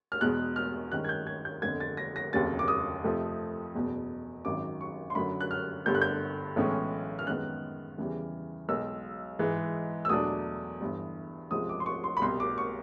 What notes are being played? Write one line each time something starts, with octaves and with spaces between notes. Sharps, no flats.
F6
E2 B2 G#3 F#6
F6
G2 D#3 G#3 C#4 F#6
G#6
G6
G#6
G6
G1 F2 D3 G#6
A6
A#6
A#6
F1 D#2 C#3 F#3 A6
D6
D#6
F2 C3 F3 A3
F#1 E2 B2
G#1 F#2 D#3 F#3 D6
C#6
C6
F#2 D3 F#3 B5
F#6
F6
G1 G2 D3 G3 G6
F#6
G6
B1 A2 E3 G#3 C#4
F6
F#2 D#3 G#3 B3 F#6
E2 C#3 E3 G3
B1 B2 G#3 E6
G#2 E3 G#3
E6
E2 B2 F#3 A3 D4 D#6
G1 G2 E3
C#2 C3 F3 G#3 D#6
D6
C6
C#6
C6
B5
C2 B2 G3 C6
D6
C#6